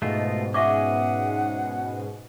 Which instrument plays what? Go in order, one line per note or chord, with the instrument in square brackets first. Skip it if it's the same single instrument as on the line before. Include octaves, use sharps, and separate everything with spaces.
[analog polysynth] G#2 B2 [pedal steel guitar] A3 F4 [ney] D#5
[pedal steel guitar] C#4 G#4 [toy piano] E5 C#6 D6 [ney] F#5